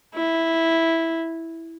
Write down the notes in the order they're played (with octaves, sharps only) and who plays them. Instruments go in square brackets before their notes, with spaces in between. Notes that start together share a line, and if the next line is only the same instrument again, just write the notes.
[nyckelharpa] E4